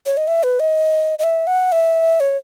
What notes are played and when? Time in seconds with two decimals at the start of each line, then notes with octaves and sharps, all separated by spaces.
0.06 C#5
0.17 D#5
0.27 E5
0.43 B4
0.60 D#5
1.19 D#5
1.24 E5
1.47 F#5
1.72 E5
2.20 C#5